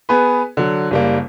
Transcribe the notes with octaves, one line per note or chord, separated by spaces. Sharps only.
B3 G#4 B4
D3 F#3
F#1 G3 A#3